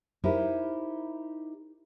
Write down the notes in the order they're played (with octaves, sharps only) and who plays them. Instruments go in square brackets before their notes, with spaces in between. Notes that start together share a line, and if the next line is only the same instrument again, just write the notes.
[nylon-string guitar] D#4 E4 G4 A#4 C5